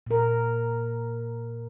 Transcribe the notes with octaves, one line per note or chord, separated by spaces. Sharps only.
A#2 A#4